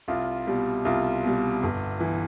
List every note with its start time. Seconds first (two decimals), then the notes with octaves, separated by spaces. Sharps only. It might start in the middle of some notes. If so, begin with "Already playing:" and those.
0.08 C2 F4
0.47 B2 G3
0.85 C2 F4
1.23 B2 G3
1.63 G1
2.00 E3